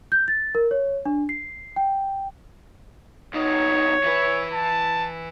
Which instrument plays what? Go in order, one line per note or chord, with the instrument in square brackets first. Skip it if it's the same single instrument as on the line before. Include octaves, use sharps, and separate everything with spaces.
[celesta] G6
A6
A#4
C#5
D4
C7
G5
[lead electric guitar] C2 D#4 [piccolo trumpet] C#5
[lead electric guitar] E3 B4
[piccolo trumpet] A5